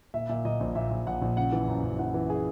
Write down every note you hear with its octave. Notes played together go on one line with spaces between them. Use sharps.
A#2 E5
A#2 E5
A#2 D#5
A#1
A#2 E5
A#1
A#1 F#5
A#1
C#3 F#5
E3
F#2
F#2
E3 F#5
E3
G#4